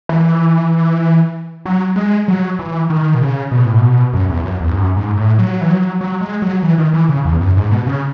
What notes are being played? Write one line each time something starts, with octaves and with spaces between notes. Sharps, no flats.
E3
F#3
G#3
F#3
E3
D#3
B2
C#3
B2
A2
B2
F#2
E2
F#2
E2
G#2
F#2
G#2
A2
F#3
E3
F#3
F#3
G#3
F#3
E3
D#3
E3
C#3
E2
F#2
G#2
B2
C#3